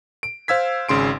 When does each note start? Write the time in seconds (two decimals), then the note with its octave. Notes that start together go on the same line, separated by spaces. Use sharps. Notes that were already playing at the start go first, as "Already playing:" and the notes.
0.23 D7
0.48 C5 F5 E6 G#6 B6
0.89 G#1 C#3 C6 D7